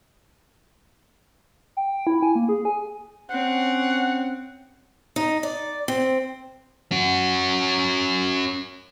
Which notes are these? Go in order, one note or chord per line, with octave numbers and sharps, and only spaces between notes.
G5
E4
G#5
A#3
G#4
G#5
C4 C#4 F#5
D#4
D5
C4
C#4 F#4